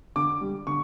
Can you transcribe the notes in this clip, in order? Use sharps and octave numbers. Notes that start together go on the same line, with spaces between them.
D3 D6
G3
D3 C#6